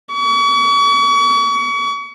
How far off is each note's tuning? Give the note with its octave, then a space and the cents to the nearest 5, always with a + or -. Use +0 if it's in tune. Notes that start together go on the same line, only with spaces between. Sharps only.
C#6 +40